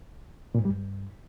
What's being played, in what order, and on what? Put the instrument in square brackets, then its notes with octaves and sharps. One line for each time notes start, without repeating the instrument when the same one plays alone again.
[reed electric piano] A#2
G#2
G3
G2